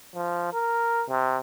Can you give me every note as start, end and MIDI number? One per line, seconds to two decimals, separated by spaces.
0.15 0.49 53
0.53 1.04 70
1.09 1.38 48